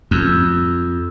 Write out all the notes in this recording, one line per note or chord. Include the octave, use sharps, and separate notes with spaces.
F2